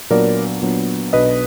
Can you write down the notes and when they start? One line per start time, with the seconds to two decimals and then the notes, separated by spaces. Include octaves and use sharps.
0.10 A#2 F#3 B3 D4 A#4 D5
0.62 A#2 F#3 B3 D4
1.13 B1 B2 F#3 D4 B4 D#5